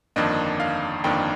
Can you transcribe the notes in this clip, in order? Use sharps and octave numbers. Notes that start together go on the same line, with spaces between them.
G1 F2 D#3 A#3 D4 D#5
F5
G1 F2 D#3 A#3 D4 G5